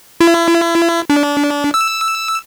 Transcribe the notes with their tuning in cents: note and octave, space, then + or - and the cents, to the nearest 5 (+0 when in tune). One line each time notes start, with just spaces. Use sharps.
E4 +35
D4 -25
E6 +0